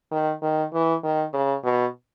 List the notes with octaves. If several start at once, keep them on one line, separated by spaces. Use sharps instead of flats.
D#3
D#3
E3
D#3
C#3
B2